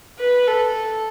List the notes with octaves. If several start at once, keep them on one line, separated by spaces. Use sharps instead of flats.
B4
A4